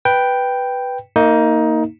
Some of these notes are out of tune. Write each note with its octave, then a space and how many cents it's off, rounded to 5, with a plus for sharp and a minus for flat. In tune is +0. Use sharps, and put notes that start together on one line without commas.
B4 +0 G5 +0
A#3 -20 D#4 +15